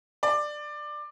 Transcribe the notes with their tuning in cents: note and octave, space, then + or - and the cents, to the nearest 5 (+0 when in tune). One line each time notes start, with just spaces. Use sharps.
D5 +15